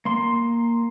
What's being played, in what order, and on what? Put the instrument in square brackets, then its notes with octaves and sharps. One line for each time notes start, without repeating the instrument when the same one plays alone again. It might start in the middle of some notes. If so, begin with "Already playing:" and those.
[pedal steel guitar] A#3 C6